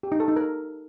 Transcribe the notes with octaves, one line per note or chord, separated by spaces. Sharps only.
G4
D#4
A4
D#4
A#4